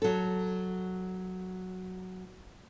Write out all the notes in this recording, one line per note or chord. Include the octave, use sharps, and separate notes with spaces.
F#3 A4